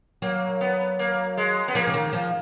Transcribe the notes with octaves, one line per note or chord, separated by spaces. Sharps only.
F#3 A#3
B3
A#3
G#3
B3
F3 A#3
C#3
D#3
F3